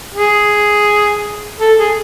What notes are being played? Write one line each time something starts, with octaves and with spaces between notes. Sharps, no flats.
G#4
A4
G#4